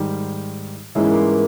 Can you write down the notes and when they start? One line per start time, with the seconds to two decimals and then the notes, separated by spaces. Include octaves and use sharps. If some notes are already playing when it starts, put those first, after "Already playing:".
Already playing: G#2 D#3 G3
0.95 G#2 E3 G#3 A#3 C#4 E4
1.03 B3
1.12 G3 A#3